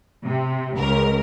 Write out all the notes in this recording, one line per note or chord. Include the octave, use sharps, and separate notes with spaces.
C3
C#2 A#4